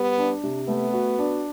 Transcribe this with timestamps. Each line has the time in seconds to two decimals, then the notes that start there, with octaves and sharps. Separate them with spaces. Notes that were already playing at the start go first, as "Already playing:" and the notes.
Already playing: G3 B3
0.18 D4
0.43 C3
0.68 A3 B3
0.93 F#4
1.18 D4